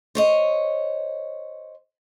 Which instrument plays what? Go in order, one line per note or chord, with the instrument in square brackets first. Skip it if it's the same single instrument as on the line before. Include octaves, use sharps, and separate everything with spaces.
[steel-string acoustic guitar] C5 C#5 D#5